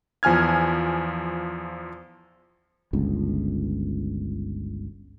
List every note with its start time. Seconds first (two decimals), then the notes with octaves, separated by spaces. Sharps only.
0.23 E2 F3 G#5 F6 G#6
2.93 G1 C#2